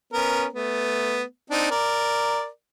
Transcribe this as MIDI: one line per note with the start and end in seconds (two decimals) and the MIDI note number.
0.13 0.46 59
0.13 0.46 61
0.13 0.46 70
0.53 1.23 57
0.53 1.23 59
1.50 1.69 60
1.50 1.69 62
1.50 1.69 63
1.71 2.48 70
1.71 2.48 74